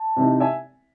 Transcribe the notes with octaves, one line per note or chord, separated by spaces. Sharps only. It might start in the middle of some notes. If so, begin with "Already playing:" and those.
Already playing: A5
C3 E3 C4 D#4
E5 G#5